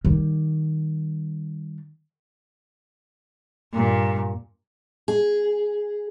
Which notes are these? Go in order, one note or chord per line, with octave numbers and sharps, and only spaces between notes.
D#3 G3
G2 A#2
G#4